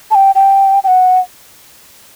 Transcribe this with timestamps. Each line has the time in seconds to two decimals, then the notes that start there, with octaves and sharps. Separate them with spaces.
0.11 A5
0.15 G5
0.35 G5
0.84 G5
0.88 F#5